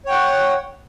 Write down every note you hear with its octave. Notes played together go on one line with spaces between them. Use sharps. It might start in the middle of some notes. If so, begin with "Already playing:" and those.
C#5 F#5 G5